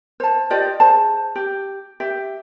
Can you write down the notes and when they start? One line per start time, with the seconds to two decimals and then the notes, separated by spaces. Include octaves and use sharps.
0.20 C5 A5
0.50 F4 G4 D5 D#5
0.80 G#4 C5 A5
1.35 G4
2.00 G4 E5